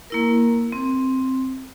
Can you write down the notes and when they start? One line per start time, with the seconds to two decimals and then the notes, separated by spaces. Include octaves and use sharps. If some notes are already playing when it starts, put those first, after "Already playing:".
0.10 A#3 E4 A#4
0.72 C4